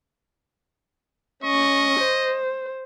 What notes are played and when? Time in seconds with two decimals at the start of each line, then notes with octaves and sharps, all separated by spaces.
1.44 C#4 D#5 C#6
2.00 C5